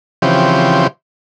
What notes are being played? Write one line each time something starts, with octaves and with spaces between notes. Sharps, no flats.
C#3 E3 F3 C4 G4